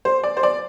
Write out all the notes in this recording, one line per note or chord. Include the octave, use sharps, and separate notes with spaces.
C5
D5
C5
D5